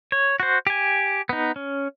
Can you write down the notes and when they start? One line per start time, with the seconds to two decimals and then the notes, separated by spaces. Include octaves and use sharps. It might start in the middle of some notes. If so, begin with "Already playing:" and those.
0.12 C#5
0.40 F#4 C5
0.67 G4 G#5
1.29 B3 D#4
1.56 C#4